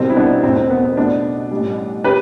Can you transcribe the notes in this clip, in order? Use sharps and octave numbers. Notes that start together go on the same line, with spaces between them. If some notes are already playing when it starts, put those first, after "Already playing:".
Already playing: C2 B2 G3 C4
E4
B3 D4
E2 B2 A3 C4
C4
B3
B3
B1 B2 A3 B3 D4
A1 A2 G3
G4 B4